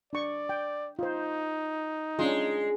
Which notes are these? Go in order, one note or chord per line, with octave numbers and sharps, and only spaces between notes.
D4 D5 C#6
G5
D#4 F4 C5
G#3 C#4 D4 F4